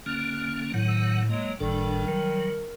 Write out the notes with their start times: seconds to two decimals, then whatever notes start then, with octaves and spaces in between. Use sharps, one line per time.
0.06 D3 A#3 C#4 F6
0.74 A2 D#3 F#3 F#5
0.89 E6
1.29 F#3 G#3 A#3
1.60 G1 A2 D#3 G3 D4 A4
2.08 F#3 A#4